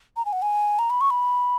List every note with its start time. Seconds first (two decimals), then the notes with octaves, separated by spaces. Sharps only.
0.17 A#5
0.25 G#5
0.33 F#5
0.42 G#5
0.79 A#5
0.90 B5
1.01 C#6
1.10 B5